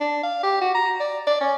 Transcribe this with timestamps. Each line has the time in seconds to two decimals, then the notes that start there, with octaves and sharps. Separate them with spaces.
0.01 D4
0.23 F5
0.43 G4
0.62 F#4
0.75 A#5
1.00 D5
1.27 D5
1.41 C#4